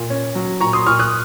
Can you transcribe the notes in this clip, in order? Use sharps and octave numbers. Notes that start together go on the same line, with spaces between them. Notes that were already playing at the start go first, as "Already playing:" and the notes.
Already playing: A#2
C#4
F#3
A#2 A#5 C#6
C6 D#6
A#2 C#6 F6
D#6 F#6